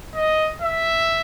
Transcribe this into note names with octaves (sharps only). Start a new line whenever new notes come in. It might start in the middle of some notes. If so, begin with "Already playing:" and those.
D#5
E5